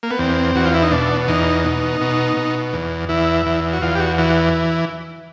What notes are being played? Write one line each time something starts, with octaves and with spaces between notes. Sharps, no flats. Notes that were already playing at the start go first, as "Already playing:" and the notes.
A#3
B3
E2 C4
E2 F#4
F4
E4
D#4
B2 D4
E2 D#4
B2
B2
B2
E2
E2 E4
E2
F#4
E2 F4
G4
F#4
E3 F#4